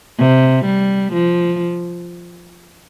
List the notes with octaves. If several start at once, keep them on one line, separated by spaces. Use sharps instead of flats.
C3
G3
F3